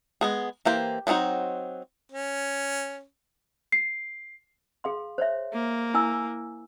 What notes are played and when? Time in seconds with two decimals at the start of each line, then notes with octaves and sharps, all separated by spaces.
0.21 G#3 B3 G#4
0.65 E3 A#3 G4 C5
1.07 F#3 B3 C4 D#4 F#4
2.12 C#4
3.72 C7
4.84 G#4 F5 C6
5.18 C5 C#5 E5
5.54 A#3
5.94 E4 G#5 E6